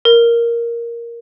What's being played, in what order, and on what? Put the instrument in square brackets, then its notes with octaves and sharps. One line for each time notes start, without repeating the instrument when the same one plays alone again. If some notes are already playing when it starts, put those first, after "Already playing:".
[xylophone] A#4